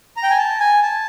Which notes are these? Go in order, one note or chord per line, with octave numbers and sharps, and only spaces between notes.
A#5
G5
G#5
A5
G#5
A5